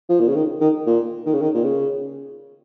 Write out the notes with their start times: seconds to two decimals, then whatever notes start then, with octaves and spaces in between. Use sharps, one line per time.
0.09 F3
0.20 A#2
0.28 C#3
0.35 D#3
0.61 D#3
0.87 A#2
1.26 D#3
1.33 C#3
1.41 D#3
1.54 A#2
1.64 C#3